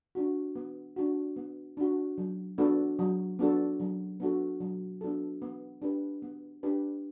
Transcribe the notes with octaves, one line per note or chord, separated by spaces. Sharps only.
D4 F#4
B3
D4 F#4
B3
D4 F#4
F#3
B3 D4 F#4 A4
F#3
B3 D4 F#4 A4
F#3
B3 D4 F#4 A4
F#3
B3 D4 F#4 A4
B3
D4 G4 B4
B3
D4 G4 B4